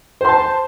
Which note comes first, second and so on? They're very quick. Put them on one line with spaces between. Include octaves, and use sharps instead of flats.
C5 C6 A5